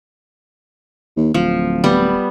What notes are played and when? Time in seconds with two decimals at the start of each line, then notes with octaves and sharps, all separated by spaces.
1.17 D#2
1.34 D1 F3
1.84 G3 B3